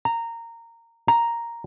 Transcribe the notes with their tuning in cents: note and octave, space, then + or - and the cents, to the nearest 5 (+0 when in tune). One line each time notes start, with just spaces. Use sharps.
A#5 -15
A#5 +0